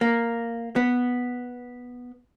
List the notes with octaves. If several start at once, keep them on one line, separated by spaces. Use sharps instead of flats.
A#3
B3